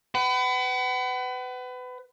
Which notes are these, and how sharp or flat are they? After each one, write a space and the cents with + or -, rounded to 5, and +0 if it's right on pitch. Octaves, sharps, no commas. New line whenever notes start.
B4 +30 F#5 +40